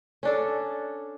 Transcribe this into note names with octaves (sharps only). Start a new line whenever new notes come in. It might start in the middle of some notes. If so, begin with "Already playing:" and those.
C#4 D4 A4